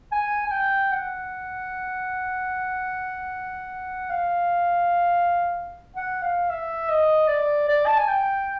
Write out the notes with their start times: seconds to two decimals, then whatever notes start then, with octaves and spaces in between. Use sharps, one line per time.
0.12 G#5
0.47 G#5
0.51 G5
0.91 F#5
4.10 F5
5.96 F#5
6.22 F5
6.50 E5
6.89 D#5
7.28 D5
7.69 D5
7.86 A5
7.97 G#5
8.08 G5